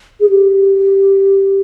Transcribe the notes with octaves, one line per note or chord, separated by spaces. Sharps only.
G#4
G4